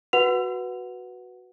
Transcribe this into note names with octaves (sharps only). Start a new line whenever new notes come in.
F#4 B4 F#5 F7